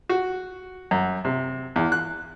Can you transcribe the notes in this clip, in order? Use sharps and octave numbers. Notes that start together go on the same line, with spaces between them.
F#4
F#2
C3
E2
F#6